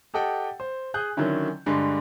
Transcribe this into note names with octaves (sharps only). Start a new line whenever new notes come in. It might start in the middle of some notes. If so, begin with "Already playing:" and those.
G4 A4 D#5 F#5 G5
C5
G#4 D#6 F#6 G6
D3 D#3 F#3 C#4 E4
G2 D3 G#3